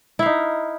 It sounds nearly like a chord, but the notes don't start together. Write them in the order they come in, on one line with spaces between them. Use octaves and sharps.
E4 F5 D#4